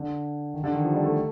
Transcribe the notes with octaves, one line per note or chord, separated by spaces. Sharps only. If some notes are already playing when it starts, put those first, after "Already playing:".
Already playing: D3
D#3
D3
D#3
F3
G3
A3